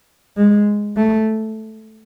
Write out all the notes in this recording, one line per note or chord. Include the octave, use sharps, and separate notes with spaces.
G#3
A3